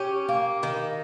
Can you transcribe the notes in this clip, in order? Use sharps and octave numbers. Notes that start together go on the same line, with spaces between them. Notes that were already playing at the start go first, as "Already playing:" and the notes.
Already playing: C#4 G4
A#3
D#3